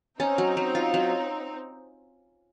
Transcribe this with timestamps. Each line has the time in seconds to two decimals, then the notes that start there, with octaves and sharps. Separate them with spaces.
0.19 C4 C#4 D#4
0.38 F#3
0.57 F#3
0.75 F4
0.94 F#3